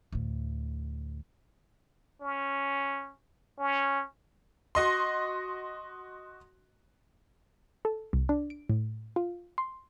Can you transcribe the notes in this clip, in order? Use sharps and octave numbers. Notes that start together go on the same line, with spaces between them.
D2 A2
C#4
C#4
F#4 D#5 C6
A4
C2
D4
D7
A2
F4
C6